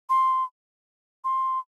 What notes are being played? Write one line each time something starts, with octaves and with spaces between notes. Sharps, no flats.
C6
C6